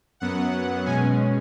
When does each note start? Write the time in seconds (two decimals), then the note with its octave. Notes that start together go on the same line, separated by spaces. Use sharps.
0.20 F#2 F#3 B3 F#5
0.86 B2 G#3 C#4 G#5